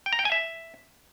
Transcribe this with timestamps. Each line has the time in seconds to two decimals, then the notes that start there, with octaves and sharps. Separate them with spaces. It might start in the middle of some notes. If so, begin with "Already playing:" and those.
0.06 G5
0.13 A#5
0.19 G5
0.25 G#5
0.32 E5